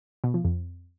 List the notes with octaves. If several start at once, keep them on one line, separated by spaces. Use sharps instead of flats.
B2
F3
F2